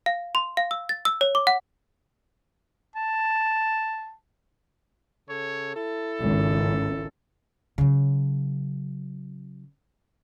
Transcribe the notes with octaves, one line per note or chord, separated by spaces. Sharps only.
F5
C6
F5
E6
A6
E6
C#5
D6
F#5
A5
C#3 A4 C#5
E4 A4
G#1 C#2
C#3 F#3